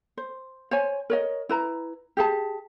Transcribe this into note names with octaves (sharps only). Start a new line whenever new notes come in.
C5
C5 C#5 G#5
A#4 C#5 D#5
E4 B4 A#5
G4 G#4 A5